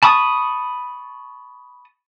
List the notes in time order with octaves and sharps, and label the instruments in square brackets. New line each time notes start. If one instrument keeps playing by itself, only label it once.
[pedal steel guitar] A5 B5 C#6 D#6